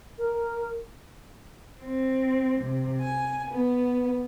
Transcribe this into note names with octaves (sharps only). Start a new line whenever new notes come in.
A#4
C4
C3
G#5
B3